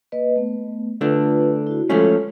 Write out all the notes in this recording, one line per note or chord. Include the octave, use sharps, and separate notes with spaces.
A#3 B4 D#5
A3 B3
D3 A3 D4 F4 B4
E4 F#4
F3 G#3 A3 C#4 F4 A4